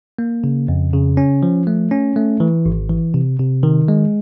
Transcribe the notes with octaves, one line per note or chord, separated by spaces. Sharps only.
A#3
C#3
F2
C#3
C#4
F3
A3
C#4
A3
E3
G#1
E3
C3
C3
D#3
G#3